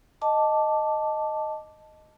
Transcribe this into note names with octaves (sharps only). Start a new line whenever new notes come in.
D#5 A5 D6